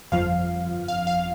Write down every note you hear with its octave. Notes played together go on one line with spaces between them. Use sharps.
G1 F2 F3 F5
F5
F5